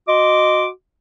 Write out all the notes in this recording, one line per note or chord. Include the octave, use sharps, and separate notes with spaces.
F#4 D#5 C6 D6